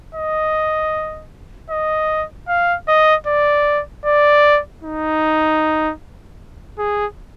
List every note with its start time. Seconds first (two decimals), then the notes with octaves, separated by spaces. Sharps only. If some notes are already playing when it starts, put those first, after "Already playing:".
0.15 D#5
1.70 D#5
2.48 F5
2.88 D#5
3.27 D5
4.06 D5
4.83 D#4
6.79 G#4